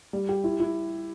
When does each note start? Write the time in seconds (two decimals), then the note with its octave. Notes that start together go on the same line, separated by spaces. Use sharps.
0.13 G3
0.29 G4
0.44 E4
0.60 E4